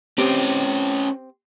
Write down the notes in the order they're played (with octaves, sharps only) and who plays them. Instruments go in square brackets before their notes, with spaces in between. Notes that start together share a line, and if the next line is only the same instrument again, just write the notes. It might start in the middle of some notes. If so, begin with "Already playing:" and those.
[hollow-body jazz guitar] C4 G4 [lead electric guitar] C#4 B4